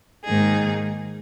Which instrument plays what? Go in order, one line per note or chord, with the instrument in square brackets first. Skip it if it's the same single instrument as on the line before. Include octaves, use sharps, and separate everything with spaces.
[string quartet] G#2 D#3 A#3 D#4 G#4